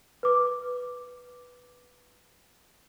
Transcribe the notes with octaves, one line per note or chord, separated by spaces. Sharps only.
B4 D6